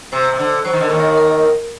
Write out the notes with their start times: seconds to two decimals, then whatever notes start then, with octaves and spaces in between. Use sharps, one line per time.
0.12 C3 C5
0.33 C3
0.39 D3
0.65 F#3 C5
0.73 D#3
0.81 D3 A#4
0.89 D#2 D#3
1.00 A#4
1.17 A#4